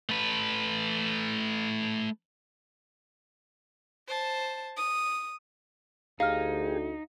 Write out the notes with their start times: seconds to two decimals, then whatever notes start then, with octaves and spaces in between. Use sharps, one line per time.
0.09 A3 B4
4.08 C5 A5
4.77 D#6
6.20 D2 D#4 G4 G#4 F5 F6